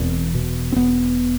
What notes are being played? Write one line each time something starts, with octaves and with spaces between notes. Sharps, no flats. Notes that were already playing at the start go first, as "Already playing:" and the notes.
Already playing: E1 E2 C4
B2
C4
E1 B3